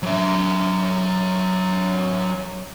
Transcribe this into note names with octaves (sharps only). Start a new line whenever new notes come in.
F#3 E5